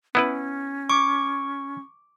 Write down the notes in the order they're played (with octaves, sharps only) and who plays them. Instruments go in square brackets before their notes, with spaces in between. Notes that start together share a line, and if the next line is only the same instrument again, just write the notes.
[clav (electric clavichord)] B3 E4 B4 [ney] C#4
[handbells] C#6 [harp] D6